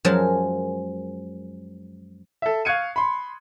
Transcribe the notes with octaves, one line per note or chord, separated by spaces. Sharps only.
F#2 F3 F#3 G#3 A#4 A5
A4 E5
F5 C#6 F#6 G#6 C#7 D#7
B5 C6